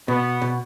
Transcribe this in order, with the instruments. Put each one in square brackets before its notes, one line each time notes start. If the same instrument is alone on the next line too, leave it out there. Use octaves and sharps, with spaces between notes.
[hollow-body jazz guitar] B2 [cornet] B3
[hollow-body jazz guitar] B2